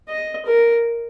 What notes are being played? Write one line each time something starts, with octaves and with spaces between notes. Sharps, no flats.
D#5
A#4